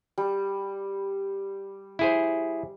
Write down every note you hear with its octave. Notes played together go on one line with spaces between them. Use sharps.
G3
E4 G#4 C5